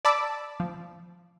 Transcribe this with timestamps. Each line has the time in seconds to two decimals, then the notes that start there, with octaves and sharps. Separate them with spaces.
0.05 D5 A5 B5 D6 E6
0.60 F3